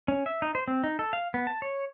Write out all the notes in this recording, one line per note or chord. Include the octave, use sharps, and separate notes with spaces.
C#4
E5
D#4
C5
C4
D#4
A4
F5
B3
A5
C#5